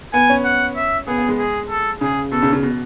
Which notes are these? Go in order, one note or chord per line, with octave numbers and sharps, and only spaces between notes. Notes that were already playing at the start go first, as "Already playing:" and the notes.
B3 G#5
C#4
F#5
E5
B3 G#4
B3
G#3
G#4
A4
C#3 G#4
B2 A4
C#3
C#3
B2